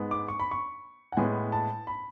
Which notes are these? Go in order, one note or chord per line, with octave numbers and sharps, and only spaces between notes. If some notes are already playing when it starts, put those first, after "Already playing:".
Already playing: G#2 G#3 B3
D6
C#6
B5
C#6
F#5
A2 G#3 B3 G#5
A5
B5